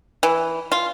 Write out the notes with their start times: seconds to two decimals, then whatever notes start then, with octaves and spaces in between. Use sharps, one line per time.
0.23 E3
0.72 F4